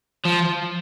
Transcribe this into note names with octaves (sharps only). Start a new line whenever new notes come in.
F3